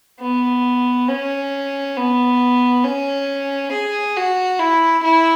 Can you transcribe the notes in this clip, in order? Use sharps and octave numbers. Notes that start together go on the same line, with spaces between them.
B3
C#4
B3
C#4
G#4
F#4
E4
E4